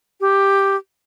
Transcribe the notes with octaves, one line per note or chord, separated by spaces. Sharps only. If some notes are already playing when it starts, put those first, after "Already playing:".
G4